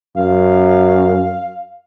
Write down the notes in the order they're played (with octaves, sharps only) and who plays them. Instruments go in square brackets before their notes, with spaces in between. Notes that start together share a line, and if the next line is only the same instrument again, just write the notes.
[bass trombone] F#2 [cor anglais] F5